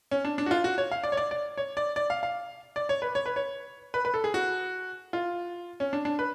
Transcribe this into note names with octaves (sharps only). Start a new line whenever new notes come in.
C#4
D4
D4
F#4
F4
F#4
C#5
F5
D5
C#5
D5
D5
C#5
D5
D5
F5
F5
D5
C#5
B4
C#5
B4
C#5
B4
B4
A4
G#4
F#4
F4
C#4
D4
D4
B4